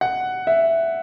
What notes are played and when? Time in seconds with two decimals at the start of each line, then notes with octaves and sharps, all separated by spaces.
0.01 F#5
0.47 E5